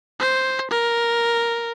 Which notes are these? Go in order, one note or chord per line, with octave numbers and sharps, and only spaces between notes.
C5
A#4